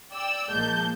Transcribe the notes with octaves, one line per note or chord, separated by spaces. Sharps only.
D5 G5 E6
A#1 F3 G#3 A#3 A5 G6